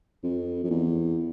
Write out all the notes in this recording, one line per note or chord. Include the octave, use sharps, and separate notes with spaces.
F2
F2
E2